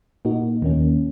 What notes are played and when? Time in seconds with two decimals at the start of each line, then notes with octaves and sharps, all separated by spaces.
0.25 A#2 A#3 D#4 F#4
0.62 D#2 D#3 A#3 C#4